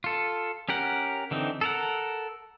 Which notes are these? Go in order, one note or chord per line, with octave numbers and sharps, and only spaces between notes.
F4 A4
C#4 G4 A#4 F#5
D3 E3 C4 D#4
A4 A#4 F#5